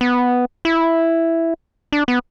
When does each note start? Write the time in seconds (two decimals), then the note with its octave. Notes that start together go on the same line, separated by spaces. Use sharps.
0.01 B3
0.65 E4
1.92 D4
2.08 B3